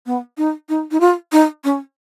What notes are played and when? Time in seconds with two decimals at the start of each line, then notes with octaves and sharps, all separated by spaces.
0.06 B3
0.38 D#4
0.69 D#4
0.91 D#4
1.00 F4
1.32 D#4
1.64 C#4